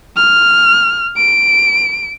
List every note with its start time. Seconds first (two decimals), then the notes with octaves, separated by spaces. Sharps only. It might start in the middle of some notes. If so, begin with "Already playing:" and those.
0.17 F6
1.17 D7